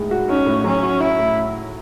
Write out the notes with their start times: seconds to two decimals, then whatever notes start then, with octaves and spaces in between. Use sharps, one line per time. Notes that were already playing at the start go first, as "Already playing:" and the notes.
Already playing: A2 G#3 D#4
0.11 F#4
0.29 C#4 D#4
0.46 A2
0.64 F#3 C#4
0.83 F#4
1.00 C#4 E4
1.19 A2